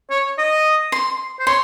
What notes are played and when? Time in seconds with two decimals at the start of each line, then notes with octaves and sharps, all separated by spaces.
0.10 C#5
0.38 D#5
0.92 C6
1.39 C5
1.47 C#5 C6